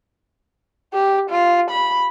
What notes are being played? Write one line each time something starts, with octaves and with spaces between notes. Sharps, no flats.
G4
F4
B5